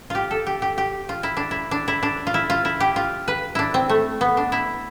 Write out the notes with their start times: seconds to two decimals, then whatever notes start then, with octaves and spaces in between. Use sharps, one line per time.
0.10 F4 G4
0.31 A4
0.46 G4
0.62 G4
0.78 G4
1.09 F4
1.23 E4
1.37 D4
1.51 E4
1.71 D4
1.88 E4
2.03 D4
2.27 F4
2.34 E4
2.50 F4
2.65 E4
2.80 G4
2.96 F4
3.28 B4
3.55 D4 E4
3.74 C4
3.89 A3
4.21 B3
4.37 D4
4.52 E4